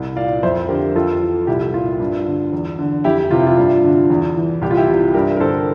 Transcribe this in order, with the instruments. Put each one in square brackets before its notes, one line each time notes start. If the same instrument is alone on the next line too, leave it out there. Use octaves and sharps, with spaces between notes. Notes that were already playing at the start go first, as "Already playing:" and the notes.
Already playing: [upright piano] C2
A#2 D5 F5
F2 C5 E5
D3 G4 A#4
F2 F4 A4
E3
C2 E4 G4
A#2 F4
G2
D3
E2
D3
F2 E4 G4
C3 E3 F4
E4
F4
G2 F4
D3
E2
E3
C2 G4
F4
E4 G4
C3 E3
G2 G4 A#4
A#4
D3 A4 C5